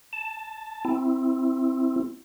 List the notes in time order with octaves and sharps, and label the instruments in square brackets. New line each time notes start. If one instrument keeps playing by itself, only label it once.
[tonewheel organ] A5
C4 E4